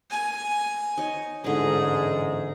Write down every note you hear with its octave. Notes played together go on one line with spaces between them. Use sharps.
G#5
D#4 C#5
A1 E2 G#2 D3 D#4 G#4